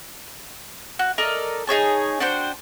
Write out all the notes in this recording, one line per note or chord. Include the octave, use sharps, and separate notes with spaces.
F#4
A4 A#4 D5 D#5
D#4 G#4 C#5 A5
D4 F#4 C5 G5